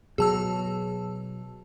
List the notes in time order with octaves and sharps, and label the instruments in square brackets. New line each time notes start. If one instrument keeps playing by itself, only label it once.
[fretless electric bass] B2 F#3 [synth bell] G#4 A5 E6